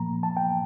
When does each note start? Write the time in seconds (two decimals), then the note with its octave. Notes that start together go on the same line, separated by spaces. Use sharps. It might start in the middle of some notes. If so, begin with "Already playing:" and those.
Already playing: A#2 F3 A#3 A#5
0.23 A5
0.37 G5